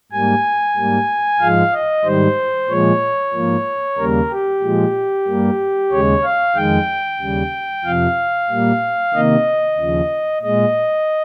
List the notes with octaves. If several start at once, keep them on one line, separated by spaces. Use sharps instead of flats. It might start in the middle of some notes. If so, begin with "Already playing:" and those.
G#2 G3 A#3 G#5
G#2 G3 A#3
G#2 F3 G#3 F5
D#5
G#2 D#3 G3 C5
A#2 F3 G#3 C#5
G#2 F3 A#3
D#2 C#3 G3 A#3 A#4
G4
A#2 F3 G#3
G2 G3 A#3
D#2 C#3 G#3 C#5
F5
F2 D#3 G#3 G5
D#2 C#3 G3
F2 C3 F3 F5
A#2 G3 A#3
C3 D#3 A#3 D#5
D#2 C#3 F3
A#2 G#3 D#5